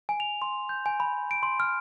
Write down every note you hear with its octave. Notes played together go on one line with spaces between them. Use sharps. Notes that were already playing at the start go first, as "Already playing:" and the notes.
G#5
F7
C6
G6
G#5
B5
D7
C6
F6